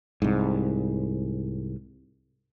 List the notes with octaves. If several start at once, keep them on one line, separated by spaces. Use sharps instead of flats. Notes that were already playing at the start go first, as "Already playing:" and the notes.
C2 G#2